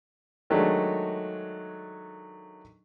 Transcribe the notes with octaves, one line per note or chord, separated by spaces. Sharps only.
D#3 F#3 G#3 A3 D4